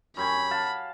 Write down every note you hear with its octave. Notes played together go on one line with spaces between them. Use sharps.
F#2 G4 G#5 B5
F5 F#5 A5